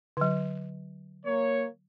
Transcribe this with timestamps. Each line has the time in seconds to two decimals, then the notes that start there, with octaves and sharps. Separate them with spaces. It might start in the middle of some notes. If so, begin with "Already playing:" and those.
0.17 D3 F#3
1.25 A#3 C#5